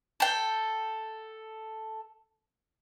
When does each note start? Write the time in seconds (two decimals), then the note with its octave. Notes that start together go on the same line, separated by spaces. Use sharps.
0.20 A4 G5